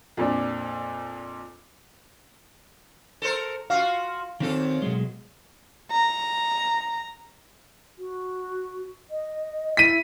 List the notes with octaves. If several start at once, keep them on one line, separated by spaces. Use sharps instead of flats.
F2 A#2 D4
A4 A#4 C5
F4 F#4 F5
F#2 D#3 C4 F4 A4
B2 F#3 G#3
A#5
F#4
D#5
E4 B6 D#7